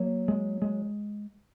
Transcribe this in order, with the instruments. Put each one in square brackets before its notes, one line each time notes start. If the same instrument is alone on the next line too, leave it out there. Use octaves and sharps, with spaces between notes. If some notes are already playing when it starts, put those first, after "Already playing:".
Already playing: [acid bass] F#3 [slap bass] A#3
[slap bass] G#3
G#3